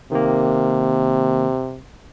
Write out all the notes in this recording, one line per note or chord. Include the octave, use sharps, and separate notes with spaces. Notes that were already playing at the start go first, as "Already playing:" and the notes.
C3 D#3 A#3